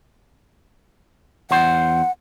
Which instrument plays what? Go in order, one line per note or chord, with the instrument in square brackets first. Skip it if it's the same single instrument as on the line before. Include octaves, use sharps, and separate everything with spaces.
[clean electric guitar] E2 C5 [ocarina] F#5